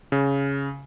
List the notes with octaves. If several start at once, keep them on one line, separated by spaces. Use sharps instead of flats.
C#3